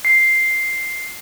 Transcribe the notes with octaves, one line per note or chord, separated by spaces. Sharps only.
C7